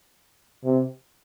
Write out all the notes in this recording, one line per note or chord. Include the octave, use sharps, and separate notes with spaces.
C3